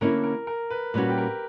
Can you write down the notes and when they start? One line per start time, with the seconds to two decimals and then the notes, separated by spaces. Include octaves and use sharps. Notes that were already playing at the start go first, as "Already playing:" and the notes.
0.01 D3 A#3 C#4 E4 A#4
0.24 A#4
0.47 A#4
0.70 B4
0.94 A#2 G3 C#4 F#4 B4
1.10 G4
1.18 A#4